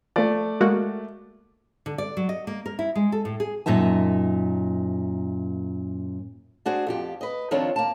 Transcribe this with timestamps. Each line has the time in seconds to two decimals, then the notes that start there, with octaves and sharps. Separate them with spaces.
0.16 F3 A3 D5
0.61 G#3 A#3 F#4
1.86 D3
1.98 D5
2.17 F#3
2.29 D#5
2.47 A#3
2.66 A#4
2.79 E4
2.96 G#3
3.12 A4
3.25 A2
3.40 G#4
3.66 F#2 A#2 D#4 E5 A5
6.66 D4 F#4 G#4 C5
6.87 F2 F3 G4
7.21 B4 D#5
7.51 D#3 F3 C4 D4 F4 C#5
7.76 A#3 A5